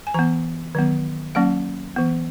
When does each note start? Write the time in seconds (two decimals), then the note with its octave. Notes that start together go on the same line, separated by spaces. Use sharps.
0.07 G#5
0.14 E3 B3 A#5
0.75 D#3 F#3 B3
1.35 F#3 A#3 C#4 F#5
1.96 E3 B3